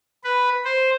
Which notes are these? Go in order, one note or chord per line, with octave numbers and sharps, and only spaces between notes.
B4
C5